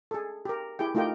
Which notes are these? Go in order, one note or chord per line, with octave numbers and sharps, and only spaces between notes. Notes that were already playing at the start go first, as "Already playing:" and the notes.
G#4 A4
G4 A#4
E4 G4 G#4 G5
A3 D#4 F4 G4 A#4 G5